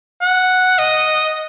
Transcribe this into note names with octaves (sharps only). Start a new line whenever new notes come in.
F#5
D#5